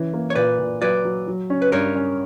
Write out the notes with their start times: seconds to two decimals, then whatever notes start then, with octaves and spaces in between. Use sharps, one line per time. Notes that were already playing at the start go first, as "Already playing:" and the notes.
Already playing: E3 C#4
0.14 A#3
0.30 C#5
0.35 A#2 B4 D5
0.59 A#2
0.81 F#3 B4 D5
1.05 F#3
1.28 F#3
1.50 C#4
1.62 B4
1.72 G2 A#4 C#5
1.95 C#4